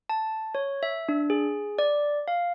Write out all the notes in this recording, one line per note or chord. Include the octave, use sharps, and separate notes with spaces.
A5
C#5
E5
D4
G#4
D5
F5